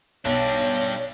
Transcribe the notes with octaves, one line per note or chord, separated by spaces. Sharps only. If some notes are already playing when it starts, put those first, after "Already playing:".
B1 G3 D4 C#5